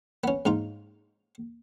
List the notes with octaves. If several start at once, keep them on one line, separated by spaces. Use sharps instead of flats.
B3 C#4
G#2 D#4 F4